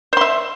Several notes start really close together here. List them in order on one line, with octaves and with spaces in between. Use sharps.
C5 C6 E5